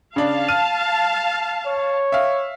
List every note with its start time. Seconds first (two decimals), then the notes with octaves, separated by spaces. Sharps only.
0.16 C#3 D4 F5 A5
0.48 F6 D#7
1.66 C#5
2.12 E5 F5